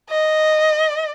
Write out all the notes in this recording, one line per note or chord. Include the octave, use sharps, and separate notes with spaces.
D#5